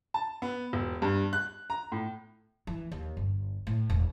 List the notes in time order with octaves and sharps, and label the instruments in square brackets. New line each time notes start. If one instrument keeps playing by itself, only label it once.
[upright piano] A5
B3
E1
G2
F#6
A#5
A2
[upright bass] E3
D#2
G1
A2
E1